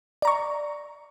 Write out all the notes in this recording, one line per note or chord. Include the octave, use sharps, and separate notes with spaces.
D5 A#5 C#6